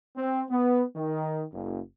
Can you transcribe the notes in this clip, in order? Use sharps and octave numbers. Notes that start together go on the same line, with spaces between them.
C4
B3
D#3
F#1